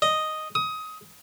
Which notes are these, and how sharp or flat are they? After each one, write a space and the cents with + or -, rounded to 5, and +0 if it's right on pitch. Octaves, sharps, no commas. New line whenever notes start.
D#5 +0
D#6 +20